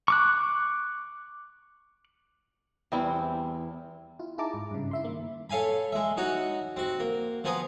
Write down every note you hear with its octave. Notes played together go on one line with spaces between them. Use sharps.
C#6 D6 F#6
E2 G3 C4 E4
E4 F4
D#4 E4 G#4 A5 A#5 D6
G#2
G2 C#3
E4 E5 C6
D#3 A#3
A4 C#5 F5 G#5 B5
G#3 E5
D#4 F#4 C#5 F#5
C4 F#4
A#3
F3 B3 C5 G#5 A#5 D#6